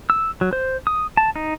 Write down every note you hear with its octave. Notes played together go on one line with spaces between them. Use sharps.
E6
F#3
C5
D#6
A5
D#4